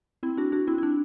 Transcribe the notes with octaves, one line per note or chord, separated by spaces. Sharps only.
C4 E4
D4 F#4
D4 F#4
C4 E4
E4
D4